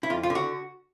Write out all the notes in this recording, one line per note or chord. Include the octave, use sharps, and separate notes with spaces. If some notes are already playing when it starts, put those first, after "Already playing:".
E4
F2 F4
F4
D3
F#4